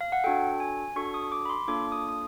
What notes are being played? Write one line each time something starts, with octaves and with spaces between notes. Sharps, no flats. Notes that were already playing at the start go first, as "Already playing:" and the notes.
F5
F#5
D4 F#4 A4 G5
G#5
D4 F#4 A4 C#6
D#6
D6
B5
C6
A#3 D4 F4 A4 D6
D#6
D#6